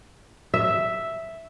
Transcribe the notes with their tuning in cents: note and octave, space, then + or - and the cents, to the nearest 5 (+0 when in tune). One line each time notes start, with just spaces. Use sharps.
E5 +0